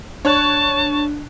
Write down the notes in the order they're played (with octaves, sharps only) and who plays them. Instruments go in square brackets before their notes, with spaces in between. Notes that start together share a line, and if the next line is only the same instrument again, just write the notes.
[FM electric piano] D4 [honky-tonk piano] C#5 C#6 F#6 [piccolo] A5